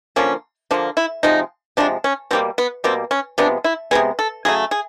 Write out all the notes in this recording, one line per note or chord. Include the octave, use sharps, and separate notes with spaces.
D3 F3 A#3 C#4
D3 F3 A#3 D4
E4
C3 F3 G#3 D#4
C3 F3 G#3 D4
C#4
B2 G3 A#3 C4
B3
B2 G3 A#3 C4
C#4
C3 F3 G#3 B3 D4
E4
C3 F3 G#3 B3 G#4
A4
C#3 F#3 A3 G#4
G#4